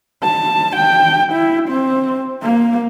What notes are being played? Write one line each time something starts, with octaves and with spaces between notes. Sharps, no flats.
A5
G5
E4
C4
A#3